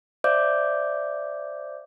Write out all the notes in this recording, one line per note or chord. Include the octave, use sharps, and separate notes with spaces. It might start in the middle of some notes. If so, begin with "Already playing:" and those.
C5 D5 E5 F5 D6 G6